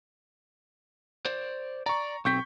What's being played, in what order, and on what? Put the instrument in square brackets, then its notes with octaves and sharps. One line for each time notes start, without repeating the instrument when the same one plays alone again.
[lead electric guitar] C5 D5
[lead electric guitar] D5 [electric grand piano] A#5 C#6
[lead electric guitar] B1 C4 [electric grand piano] C#6 G6 B6